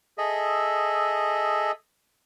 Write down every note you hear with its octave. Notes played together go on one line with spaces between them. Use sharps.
G#4 A4 D#5 E5